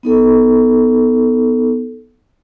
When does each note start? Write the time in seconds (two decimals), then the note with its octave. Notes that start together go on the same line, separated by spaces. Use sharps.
0.03 B3 D#4 A4